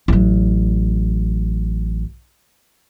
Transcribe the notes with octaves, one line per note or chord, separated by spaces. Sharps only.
A1 F#3